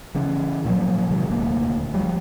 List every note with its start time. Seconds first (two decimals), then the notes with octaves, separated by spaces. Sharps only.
0.15 C#3 E3 C#4
0.65 A#2 F3 F#3 A#3
1.11 C3 D#3 F#3 G#3
1.30 D#1 D2 A#3
1.94 F3 G3